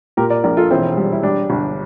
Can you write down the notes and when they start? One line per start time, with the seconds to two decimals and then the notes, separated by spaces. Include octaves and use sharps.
0.17 A#2 G4 A#4
0.30 A#4 D5
0.44 A#1 A#4 D5
0.57 F4 A4
0.70 E1 C4 E4
0.97 G3
1.12 E4
1.23 G3 D4
1.50 G1